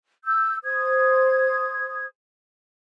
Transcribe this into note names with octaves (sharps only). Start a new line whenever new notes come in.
E6 G6
C5 D#6 G#6